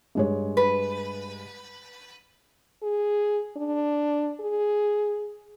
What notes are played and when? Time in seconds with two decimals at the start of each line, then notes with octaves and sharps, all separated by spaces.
0.15 G2 G#3 C#5
0.57 B4
2.83 G#4
3.56 D4
4.40 G#4